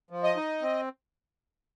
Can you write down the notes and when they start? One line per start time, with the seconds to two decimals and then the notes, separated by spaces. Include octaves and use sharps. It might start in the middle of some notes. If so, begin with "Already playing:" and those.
0.11 F3
0.23 D#5
0.36 D#4
0.62 C4